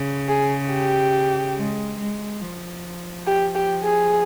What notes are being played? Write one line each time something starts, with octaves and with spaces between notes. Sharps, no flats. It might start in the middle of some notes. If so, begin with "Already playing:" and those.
Already playing: C#3
G#4
G4
G#3
G#3
F3
G4
G4
G#4